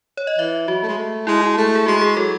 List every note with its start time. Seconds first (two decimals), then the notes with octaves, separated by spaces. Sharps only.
0.17 C#5
0.27 D#5
0.39 E3 E5
0.68 F#3 F#4
0.83 A3
0.88 G#3
0.98 A3
1.27 G#3 E4
1.42 E4
1.57 A3
1.75 G#4
1.86 G#3 F#4
2.01 G#4
2.16 F#3 A4